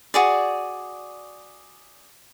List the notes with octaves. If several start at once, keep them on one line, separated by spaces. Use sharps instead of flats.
F#4 G#4 D5